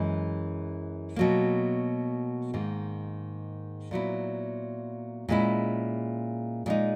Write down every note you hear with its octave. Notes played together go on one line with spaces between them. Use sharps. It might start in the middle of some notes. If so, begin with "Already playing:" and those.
Already playing: F#2 E3 G#3
B2 F#3 A#3
G#2 D#3 A#3
A#2 F#3 B3 E4
A#2 G#3 C#4 E4
A#2 G#3 D#4